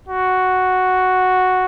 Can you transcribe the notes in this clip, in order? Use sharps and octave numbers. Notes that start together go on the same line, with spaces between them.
F#4